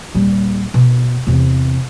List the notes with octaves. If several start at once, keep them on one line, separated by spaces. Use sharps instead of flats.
D#1 G3
B2
E2 C3